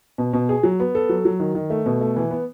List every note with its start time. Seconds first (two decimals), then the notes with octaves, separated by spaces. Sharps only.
0.18 B2
0.33 B2
0.49 G#4
0.63 F#3
0.80 B3
0.95 A4
1.09 F#3
1.25 F#3
1.40 D#3
1.55 D#3
1.70 A3
1.86 B2
2.01 A3
2.16 E3
2.31 B3